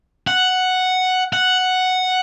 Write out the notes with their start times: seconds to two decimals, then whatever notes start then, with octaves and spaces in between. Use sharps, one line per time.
0.27 F#5
1.33 F#5